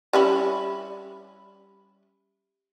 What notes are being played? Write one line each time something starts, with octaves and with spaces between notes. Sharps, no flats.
G3 C#4 E4